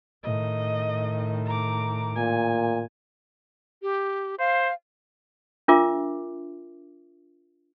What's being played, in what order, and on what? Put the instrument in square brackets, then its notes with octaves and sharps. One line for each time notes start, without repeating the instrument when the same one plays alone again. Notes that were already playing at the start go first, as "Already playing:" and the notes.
[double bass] A2 D#3 [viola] D#5
[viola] A#5 D6
[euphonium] A#2 [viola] G#5
[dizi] G4
[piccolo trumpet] C5 [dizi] F5
[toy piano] D4 F4 A#4 E5 D6